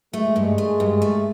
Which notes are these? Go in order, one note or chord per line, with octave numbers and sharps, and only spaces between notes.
G#3 A3
G2
A3
G2
A3